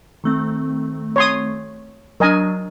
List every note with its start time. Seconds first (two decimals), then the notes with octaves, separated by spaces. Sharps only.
0.24 D#3 A3 C4
1.16 C#5 C6 D#6
2.20 F#3 D4 A#4 D#5 G#5